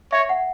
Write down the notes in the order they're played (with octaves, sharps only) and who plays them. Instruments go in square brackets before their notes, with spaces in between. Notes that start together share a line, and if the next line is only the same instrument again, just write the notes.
[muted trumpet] C#5 [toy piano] E5
[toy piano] F#5